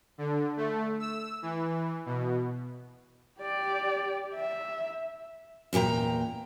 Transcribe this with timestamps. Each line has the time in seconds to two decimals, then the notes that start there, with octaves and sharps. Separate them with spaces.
0.18 D3
0.57 A3
0.99 E6
1.42 E3
2.06 B2
3.40 G4 D5
4.34 E5
5.73 E2 A#2 G4 G5 A#5